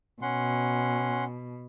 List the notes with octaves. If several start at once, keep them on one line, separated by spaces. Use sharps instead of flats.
B2 C#4 F#5 C6